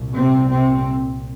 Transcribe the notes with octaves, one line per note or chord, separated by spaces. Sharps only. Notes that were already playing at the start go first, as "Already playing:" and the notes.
Already playing: C2 A#2
C3 C4
C3 C4